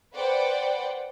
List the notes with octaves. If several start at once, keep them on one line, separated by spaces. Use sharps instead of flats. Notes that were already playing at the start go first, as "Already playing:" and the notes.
B4 C5 D5 F#5 G5